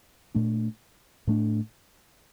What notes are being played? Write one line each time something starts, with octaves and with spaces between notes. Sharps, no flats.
A#2 A3 D4
A2 A3 D4